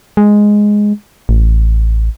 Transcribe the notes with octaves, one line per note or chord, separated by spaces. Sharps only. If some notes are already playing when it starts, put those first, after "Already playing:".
G#3
A1